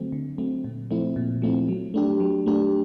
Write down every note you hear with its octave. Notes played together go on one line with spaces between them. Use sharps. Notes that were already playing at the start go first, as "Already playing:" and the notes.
Already playing: D3 F#3 A3 C4
D3
F#3 A3 C4
A#2
F3 A3 C4 E4
A#2
F3 A3 C4 E4
F#3
A3 D4 G4
F#3
A3 D4 G4